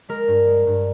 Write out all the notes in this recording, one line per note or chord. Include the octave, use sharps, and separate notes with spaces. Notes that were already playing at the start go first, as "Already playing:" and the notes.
G#3 A#4
G2
G#3
G2